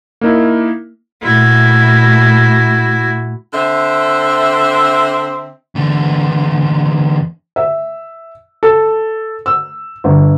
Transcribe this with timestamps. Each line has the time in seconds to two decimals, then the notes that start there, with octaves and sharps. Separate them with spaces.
0.21 A#3 D#4 E4
1.22 A#2 A3 E4 F#4
3.53 D3 C4 E5
5.75 E2 D3
7.56 E5
8.63 A4
9.46 E6
10.04 G1